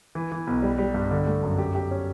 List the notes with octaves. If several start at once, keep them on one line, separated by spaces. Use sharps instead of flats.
E3
E3
B1
G3
G3
G2
D3
A3
F#2
G4
G4
C#4